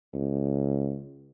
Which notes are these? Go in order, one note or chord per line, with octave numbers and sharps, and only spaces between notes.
C#2